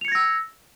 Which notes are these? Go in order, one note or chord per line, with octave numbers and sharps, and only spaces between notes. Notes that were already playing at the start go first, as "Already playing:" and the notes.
E6 G#6 A#6 C#7 F7